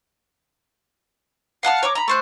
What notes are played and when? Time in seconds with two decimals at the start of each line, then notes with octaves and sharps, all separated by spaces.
1.63 F5 F#5 A5 F6
1.83 C#5 A#5 D6
1.95 A#5 B5
2.08 A3 C5 F#6